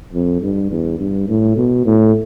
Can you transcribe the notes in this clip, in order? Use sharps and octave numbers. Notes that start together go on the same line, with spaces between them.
F2
G2
E2
G2
A2
B2
A2